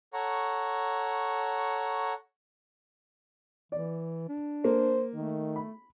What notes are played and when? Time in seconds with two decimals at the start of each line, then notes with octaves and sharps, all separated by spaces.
0.13 A4 C#5 F#5 A#5 C#6
3.72 E3 D5
4.29 D4
4.64 A#3 C5
5.15 D#3 A3
5.56 B5